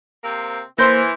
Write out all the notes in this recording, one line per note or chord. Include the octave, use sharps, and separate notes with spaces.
C3 A#3 C4
E3 A#3 C5 C6 G6 A#6